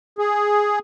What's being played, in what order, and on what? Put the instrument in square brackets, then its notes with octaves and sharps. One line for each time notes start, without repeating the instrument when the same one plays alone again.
[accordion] G#4